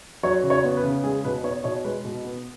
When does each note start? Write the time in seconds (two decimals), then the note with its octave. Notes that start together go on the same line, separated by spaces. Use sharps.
0.23 F#3 C#5
0.43 C#3
0.50 C#5
0.64 B3
0.77 B4
0.84 C#3
1.03 G#3 G#4
1.25 B2 B4
1.44 B3 C#5
1.64 B2 C#5
1.84 G#3 B4
2.05 B2
2.24 B3